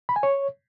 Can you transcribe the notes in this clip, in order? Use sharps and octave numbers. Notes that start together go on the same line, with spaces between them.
B5
G#5
C#5